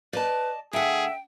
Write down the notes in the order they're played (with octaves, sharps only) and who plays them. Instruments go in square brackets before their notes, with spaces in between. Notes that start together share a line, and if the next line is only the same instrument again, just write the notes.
[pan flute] B4 [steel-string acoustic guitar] D5 D#5 A5
[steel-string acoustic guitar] D2 F#5 [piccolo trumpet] G#4 [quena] E5 [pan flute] G5